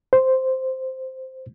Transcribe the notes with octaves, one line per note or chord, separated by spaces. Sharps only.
C5